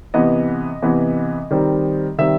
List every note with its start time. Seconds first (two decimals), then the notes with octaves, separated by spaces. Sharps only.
0.14 C3 E3 B3 D#5
0.82 C3 E3 B3
1.51 D#3 G3 C4
2.18 D#3 G3 C4 E5